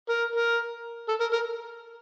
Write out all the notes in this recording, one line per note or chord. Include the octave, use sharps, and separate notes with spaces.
A#4
A#4
A4
A#4
A#4